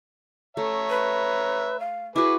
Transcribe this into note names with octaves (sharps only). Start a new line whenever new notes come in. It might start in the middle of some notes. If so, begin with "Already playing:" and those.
A3 C#5 E5 A#5
B4
F5
E4 F#4 G#4 B4 D6